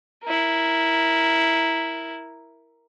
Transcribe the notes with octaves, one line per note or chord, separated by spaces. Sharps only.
E4 A#4